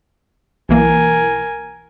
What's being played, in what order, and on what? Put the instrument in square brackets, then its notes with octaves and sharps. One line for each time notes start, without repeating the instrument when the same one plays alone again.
[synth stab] B1 E3 A#3 [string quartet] A#4 G#5